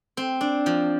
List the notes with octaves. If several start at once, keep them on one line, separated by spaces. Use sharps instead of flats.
C4
D4
F3